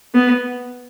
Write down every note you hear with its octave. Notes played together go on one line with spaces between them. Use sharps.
B3